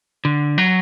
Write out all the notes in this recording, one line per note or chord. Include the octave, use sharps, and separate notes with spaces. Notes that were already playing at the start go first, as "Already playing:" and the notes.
D3
F#3